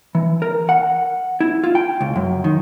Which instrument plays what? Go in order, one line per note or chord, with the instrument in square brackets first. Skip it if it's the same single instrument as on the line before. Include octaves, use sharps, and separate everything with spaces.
[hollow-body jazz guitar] E3
A#4
F#5
E4
F4
G5
C#2
F#2
D#3